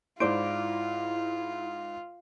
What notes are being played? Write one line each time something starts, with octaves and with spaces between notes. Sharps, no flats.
G#2 E4 F4 C5 D5 D7